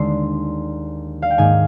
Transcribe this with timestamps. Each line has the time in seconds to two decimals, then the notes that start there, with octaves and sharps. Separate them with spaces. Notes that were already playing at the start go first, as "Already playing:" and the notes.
Already playing: D#2 D3 G#3 D4 C6
1.22 F5
1.30 G5
1.38 G#2 D#3 A#3 D#4 G#5